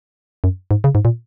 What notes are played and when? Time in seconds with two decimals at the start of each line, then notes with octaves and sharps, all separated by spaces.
0.44 F#2
0.71 G#2
0.84 C#3
0.95 G#2
1.05 A#2